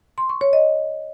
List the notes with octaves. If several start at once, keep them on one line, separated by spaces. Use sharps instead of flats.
C6
C#6
C#5
D#5